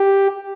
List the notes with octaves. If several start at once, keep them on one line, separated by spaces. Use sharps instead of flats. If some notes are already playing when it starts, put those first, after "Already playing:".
Already playing: G4